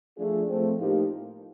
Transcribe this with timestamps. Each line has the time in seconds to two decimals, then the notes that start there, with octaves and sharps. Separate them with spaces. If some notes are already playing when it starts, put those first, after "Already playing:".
0.17 F3 A3 D4 F4 G#4
0.47 F3 A3 C4
0.78 A2 F3 A#3 D#4 G4